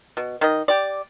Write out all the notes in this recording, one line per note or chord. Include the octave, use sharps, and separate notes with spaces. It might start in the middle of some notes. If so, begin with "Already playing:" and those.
B2
D#3 D#5
G4 D5